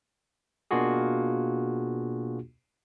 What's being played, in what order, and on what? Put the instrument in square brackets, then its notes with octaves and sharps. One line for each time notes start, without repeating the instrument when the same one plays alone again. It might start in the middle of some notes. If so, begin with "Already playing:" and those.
[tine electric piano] B2 A#3 D4 F4 F#4 G#4